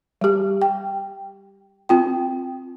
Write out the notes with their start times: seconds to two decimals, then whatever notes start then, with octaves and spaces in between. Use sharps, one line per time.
0.21 G3 G4
0.62 G5
1.89 C4 F4 G5